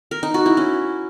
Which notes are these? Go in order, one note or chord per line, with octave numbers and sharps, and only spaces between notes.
A#4
D#4
F#4
E4
C#4